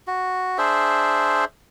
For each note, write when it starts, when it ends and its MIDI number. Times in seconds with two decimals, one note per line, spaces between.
0.07 0.58 66
0.58 1.45 62
0.58 1.45 68
0.58 1.45 72
0.58 1.45 76